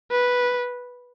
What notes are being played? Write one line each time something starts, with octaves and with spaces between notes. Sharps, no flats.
B4